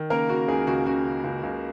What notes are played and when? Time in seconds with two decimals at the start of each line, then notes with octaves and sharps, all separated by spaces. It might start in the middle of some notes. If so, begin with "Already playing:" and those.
Already playing: D#3
0.10 C#3 A#3 A#4
0.29 C#3 F#4
0.48 C#2 G#4
0.67 C#2 F#4
0.86 C#3 F#4
1.06 C#3
1.24 C#2
1.43 C#2